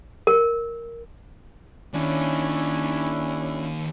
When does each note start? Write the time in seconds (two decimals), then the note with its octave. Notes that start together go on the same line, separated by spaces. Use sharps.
0.27 A#4
1.94 D#2 D#3 C#4 D4 E4